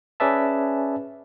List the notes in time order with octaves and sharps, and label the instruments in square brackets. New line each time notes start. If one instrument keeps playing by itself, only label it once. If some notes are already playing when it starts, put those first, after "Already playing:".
[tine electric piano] C#4 G#4 B4 D5 E5 A5